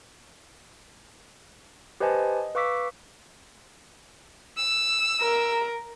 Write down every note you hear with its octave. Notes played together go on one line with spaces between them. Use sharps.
G4 B4 C5 D#5 G#5 A5
D#5
B4 F5 C#6 D6 E6 B6
E6
A#4